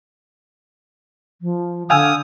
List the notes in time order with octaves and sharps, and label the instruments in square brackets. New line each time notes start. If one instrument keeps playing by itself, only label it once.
[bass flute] F3
[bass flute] D3 [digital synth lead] F5 [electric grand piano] G5 G#5 E6 [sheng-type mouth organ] D#6